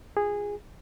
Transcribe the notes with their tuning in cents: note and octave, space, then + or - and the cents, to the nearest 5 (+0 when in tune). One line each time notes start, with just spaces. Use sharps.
F4 +15 G#4 -15